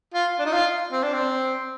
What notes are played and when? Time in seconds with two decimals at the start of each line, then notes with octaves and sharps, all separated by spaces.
0.14 F4
0.39 D4
0.46 D#4
0.53 F4
0.92 C4
1.03 D4
1.14 C4